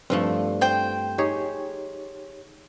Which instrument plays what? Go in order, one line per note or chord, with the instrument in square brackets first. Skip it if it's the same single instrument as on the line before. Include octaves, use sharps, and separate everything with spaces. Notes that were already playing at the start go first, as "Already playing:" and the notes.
[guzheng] G2 F3 A3 [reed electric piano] C4
[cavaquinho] C5 G5
[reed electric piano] D#4 G4 C#5 [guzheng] G#4